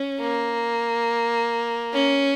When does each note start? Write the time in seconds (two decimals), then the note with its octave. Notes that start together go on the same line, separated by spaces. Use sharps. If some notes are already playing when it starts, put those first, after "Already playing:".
Already playing: C#4
0.20 A#3
1.93 C#4